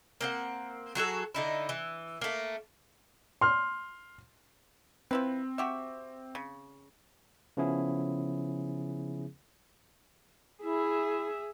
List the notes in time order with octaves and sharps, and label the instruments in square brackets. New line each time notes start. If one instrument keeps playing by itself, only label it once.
[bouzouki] A#3 C4 F#5
F#3 F#4 G#4 A4
D3 D#4 E4
E3
A3 A#3
[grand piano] C6 F6
[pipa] F3 E4 B4 [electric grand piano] C4
[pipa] F#4 G4 E5
C#3
[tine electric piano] C#3 F3 B3 C#4 E4 G#4
[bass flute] E4 [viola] G#4 E5